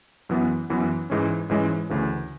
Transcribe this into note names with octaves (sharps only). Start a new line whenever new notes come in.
F#2 E3 B3
F#2 E3 B3
G#2 E3 G#3 C#4
G#2 E3 G#3 C#4
D2 C#3 E3